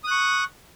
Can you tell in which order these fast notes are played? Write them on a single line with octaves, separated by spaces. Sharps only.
D#6 F#6 C#6